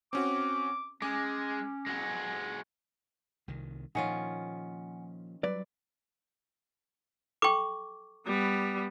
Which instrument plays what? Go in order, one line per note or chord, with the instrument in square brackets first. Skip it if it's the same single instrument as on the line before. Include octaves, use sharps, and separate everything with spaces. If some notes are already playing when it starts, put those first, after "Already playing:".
[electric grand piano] C4 C#4 F#4 [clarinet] D6
[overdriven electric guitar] G#3 [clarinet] C#4 [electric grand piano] D6
[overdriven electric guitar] G#3 F#4
[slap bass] C2 D#3
[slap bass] A#2 F3 [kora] D#3 C#4 F4 [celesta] F#5 G#5 C#7
[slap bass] F#3 G3 [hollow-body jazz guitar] B4 D5
[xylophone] A4 G5 [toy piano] C#6 D6
[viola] G3 B3